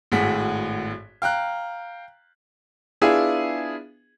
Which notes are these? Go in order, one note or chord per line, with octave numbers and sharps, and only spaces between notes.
G#1 A2 F#4 G#4 B6
F5 G5 A#5 F#6
B3 D4 E4 F4 G#4